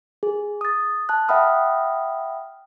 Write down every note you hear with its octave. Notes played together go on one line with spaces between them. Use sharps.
G#4
D#6 A6
A5 F#6
E5 F#5 G5 B5 D#6 F6